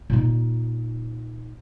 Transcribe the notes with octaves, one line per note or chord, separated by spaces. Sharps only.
A#2 D#4